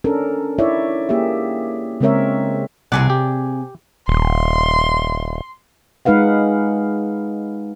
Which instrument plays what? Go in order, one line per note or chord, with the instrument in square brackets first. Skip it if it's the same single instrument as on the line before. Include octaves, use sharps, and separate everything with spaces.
[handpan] C#4 D4 A4 A#4
D#4 E4 C#5 D5 E5
A#3 G4 G#4 E5
C#3 G#3 C4 A#4 C#5 E5
[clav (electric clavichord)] C2 F#5 [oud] C3 G#4 D5
[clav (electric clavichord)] G4
[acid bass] D#1 [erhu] C6
[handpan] G#3 D#4 B4 F5 F#5